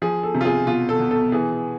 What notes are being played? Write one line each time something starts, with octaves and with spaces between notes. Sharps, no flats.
F3 G#4
A4
C3
F4
G#4
B2 F4
A4
B2
A4
E3 G#4